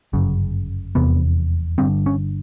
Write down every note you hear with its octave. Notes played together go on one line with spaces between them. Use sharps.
G1 F#2 C#3
F1 E2 C3 B3
G1 G2 D3 C4
C#4